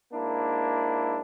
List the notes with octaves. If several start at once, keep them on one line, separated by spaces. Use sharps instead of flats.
G#2 A#3 D4 E4